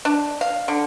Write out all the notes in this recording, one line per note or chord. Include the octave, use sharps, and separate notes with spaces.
D4
F5
D3